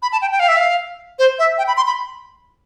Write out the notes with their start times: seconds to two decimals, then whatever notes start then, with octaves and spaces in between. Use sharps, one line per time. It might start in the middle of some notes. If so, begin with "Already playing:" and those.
0.02 B5
0.12 A5
0.22 G5
0.32 G5
0.40 F5
0.48 E5
0.57 F5
1.19 C5
1.39 E5
1.58 G5
1.67 B5
1.77 C6
1.87 B5